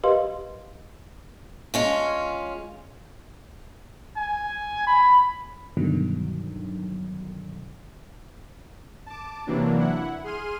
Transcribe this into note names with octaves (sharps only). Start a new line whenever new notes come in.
G4 A#4 B4 D#5 F5 C6
G#3 C#4 F4
G#5
B5
G2 B2 D3 D#3 F#3
A5 D6
C3 E3 F#3 A#3 D4
E4 F#5
G#4 C6 F6 D#7